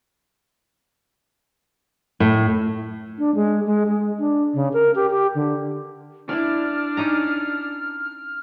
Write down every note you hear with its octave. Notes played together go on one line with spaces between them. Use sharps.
A2
D4
G#3
G#3
G#3
D4
C#3
A#4
G4
G4
D3
D4 E4 D5 F6
C#4 D#4 A#5